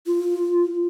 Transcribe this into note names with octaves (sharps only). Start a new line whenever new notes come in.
F4